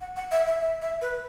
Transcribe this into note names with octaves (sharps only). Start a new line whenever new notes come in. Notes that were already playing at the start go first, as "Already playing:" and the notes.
F#5
F#5
E5
E5
E5
E5
B4